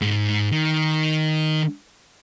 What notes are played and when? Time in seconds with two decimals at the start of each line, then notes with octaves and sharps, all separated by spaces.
0.02 G#2
0.52 D#3